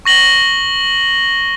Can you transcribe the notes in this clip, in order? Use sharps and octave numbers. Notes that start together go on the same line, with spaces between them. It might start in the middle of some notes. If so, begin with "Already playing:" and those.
C#6 A#6 F#7 G7